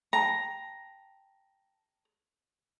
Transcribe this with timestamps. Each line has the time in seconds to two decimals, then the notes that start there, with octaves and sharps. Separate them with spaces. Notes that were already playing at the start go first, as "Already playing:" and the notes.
0.13 G5 A5 A#5